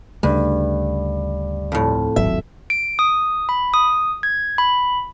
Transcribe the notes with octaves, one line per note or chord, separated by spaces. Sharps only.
D2 G2 C#3 A3
F2 A2
D#1 G#1 F#3 E5
D7
D#6
B5
D#6
G#6
B5